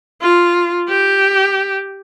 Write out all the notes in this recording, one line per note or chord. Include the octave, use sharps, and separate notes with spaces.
F4
G4